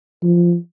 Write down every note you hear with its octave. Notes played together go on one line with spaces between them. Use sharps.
F3